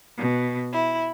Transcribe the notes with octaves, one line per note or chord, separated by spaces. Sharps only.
B2
E4